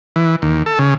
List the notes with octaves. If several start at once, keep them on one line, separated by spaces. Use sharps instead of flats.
E3
D#2
A4
C#3